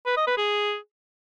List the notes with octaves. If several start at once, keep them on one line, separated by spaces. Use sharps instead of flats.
B4
D#5
B4
G#4